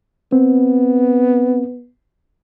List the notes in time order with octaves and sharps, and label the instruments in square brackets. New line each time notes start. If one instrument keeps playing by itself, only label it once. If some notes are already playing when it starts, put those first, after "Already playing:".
[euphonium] B3 [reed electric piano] C4